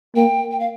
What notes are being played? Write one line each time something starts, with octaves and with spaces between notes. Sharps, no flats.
A#3 G5
G5
F5